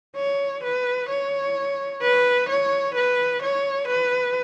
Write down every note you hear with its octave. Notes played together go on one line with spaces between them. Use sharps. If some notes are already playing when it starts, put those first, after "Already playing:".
C#5
B4
C#5
B4
C#5
B4
C#5
B4